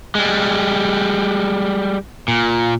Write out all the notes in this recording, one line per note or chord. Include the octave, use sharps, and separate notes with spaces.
G3 G#3
A#2